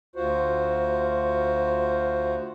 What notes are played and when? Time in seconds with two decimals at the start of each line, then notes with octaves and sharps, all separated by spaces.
0.16 D2 F4 F#4 C5